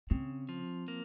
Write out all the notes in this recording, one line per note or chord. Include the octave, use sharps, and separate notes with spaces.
C#3 C4
F3
A#3